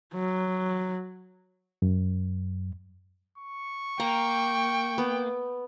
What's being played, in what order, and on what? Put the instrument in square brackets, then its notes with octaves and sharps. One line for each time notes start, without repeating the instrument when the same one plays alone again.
[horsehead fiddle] F#3
[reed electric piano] F#2
[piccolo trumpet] C#6
[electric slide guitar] A#3 [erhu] G5 [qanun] A#5
[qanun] B3